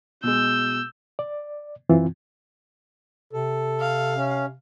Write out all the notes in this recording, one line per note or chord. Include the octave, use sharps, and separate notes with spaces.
B2 G#3 E6 G6
D5
F#2 E3 C4 F4
C3 A4
F5
C#4